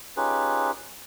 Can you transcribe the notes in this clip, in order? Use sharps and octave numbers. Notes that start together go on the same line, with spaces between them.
C#4 D#4 F4 G4 G#4 B4